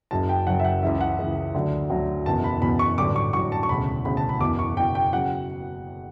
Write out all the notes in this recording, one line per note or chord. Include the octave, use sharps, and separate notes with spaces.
F#1 F#2 C#3 F#3 A5
G5
F#1 F#2 C#3 F#3 F#5
E5
F#5
C#2 C#3 E3 E5
F#5
C#2 C#3 E3
D2 D3 F#3
D2 D3 F#3
F#1 E2 B2 A5
B5
F#1 E2 B2 B5
C#6
A1 G2 D3 F#3 D6
C#6
A1 G2 D3 F#3 C#6
A5
C#6
E1 D2 C#3 B5
E1 D2 C#3 B5
A5
B5
F#1 E2 B2 D6
C#6
F#1 E2 B2 G5
G5
C#3 F#3 F#5